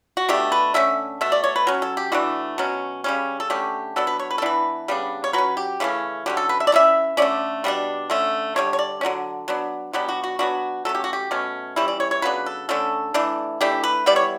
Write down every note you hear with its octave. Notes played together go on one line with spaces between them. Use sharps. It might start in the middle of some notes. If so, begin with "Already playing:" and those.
F#4
B2 A3 D4 G4
B4
D3 A3 C#4 E5
B2 A3 E5
D5
C#5
B4
F#3 C#4
A4
G4
E3 A3 D4 F#4
B2 F#3 C#4
C#3 G3 C#4
A4
D3 A3 C#4 G4
F#3 B3 D4 A4
B4
C#5
B4
A4
E3 B3 D4 B4
C#3 G3 B3 D4
C#5
F#3 C#4 B4
G4
C#3 E3 A3 C#4
D3 F#3 C#4 G4
A4
B4
E5
D5
E3 A3 C#4 E5
D3 A3 C#4 D5
B2 G3 B3 D4
D3 A3 C#4
D3 G3 D4 C#5
C#5
D5
D3 F#3 A3 C#4
F#3 B3 D4
B2 F#3 B3 D4 G4
F#4
F#4
F#3 B3 D4 F#4
F#3 A3 C#4 A4
G4
F#4
G4
B2 A3 C#4
E3 G3 C#4 E4
D5
C#5
C#5
C#3 F#3 B3 D4 B4
A4
D3 A3 C#4 A4
E3 A3 D4
E3 A3 D4 G4
B4
E3 G3 B3 D5
C#5